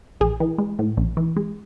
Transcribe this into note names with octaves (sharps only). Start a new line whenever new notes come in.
A#1 G#4
E3
G#3
A2
A#1
E3
G#3